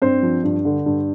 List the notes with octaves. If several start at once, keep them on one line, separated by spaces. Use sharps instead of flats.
G2 C4 C5
F3
G2
D3
G2